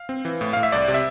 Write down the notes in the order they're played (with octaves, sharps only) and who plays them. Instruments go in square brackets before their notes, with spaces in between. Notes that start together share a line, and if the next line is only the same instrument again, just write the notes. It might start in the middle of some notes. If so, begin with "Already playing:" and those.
Already playing: [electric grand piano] F5
C4
E3
A2
A2 F5
E5
C2 D5
C3
E5